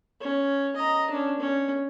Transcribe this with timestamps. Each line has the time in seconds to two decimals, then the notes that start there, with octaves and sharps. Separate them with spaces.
0.20 C#4
0.76 D#5 A#5
1.11 C#4 D4
1.40 C#4